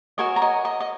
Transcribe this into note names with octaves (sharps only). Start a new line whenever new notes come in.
F#4 A#4 C#5 D#5 G#5
A#5
D#5 G#5
D#5
D#5